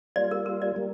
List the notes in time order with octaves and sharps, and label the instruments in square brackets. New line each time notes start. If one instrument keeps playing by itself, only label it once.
[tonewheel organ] G3 A#3 F4 [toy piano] D5
[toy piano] A#4
A#4
D5
[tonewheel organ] G3 A#3